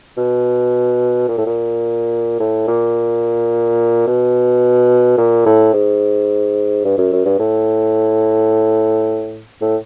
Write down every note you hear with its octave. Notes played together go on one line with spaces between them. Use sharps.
B2
A#2
A2
A#2
A2
A#2
B2
A#2
A2
G#2
G2
F#2
F#2
G2
A2
A2